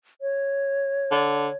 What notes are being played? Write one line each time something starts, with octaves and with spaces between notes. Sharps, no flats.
C#5
D3